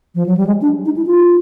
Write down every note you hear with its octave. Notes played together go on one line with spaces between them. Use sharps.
F3
F#3
G3
G#3
D4
D#4
E4
F4